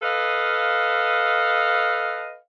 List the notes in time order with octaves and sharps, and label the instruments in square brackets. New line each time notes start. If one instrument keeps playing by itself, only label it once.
[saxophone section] A4 B4 D#5 F5